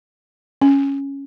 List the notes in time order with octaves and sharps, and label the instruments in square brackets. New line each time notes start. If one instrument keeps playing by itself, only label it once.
[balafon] C#4